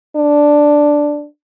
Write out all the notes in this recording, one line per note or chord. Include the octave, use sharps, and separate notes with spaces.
D4